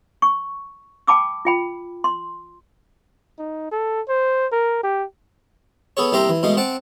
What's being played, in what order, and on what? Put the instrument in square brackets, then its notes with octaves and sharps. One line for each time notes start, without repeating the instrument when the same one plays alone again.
[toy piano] C#6
G5 A5 B5 D6 E6
F4 G5 B5
C6
[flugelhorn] D#4
A4
C5
A#4
G4
[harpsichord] B3 G#4 A4 C#5
C2 A#3 G4 E5 A#5 C6
E3
B2 G#3 A3 F5
C4 F#5 A5 D6